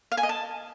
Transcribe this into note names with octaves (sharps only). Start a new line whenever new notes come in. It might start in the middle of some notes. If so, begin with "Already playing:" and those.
F5
G#5
D#5
A5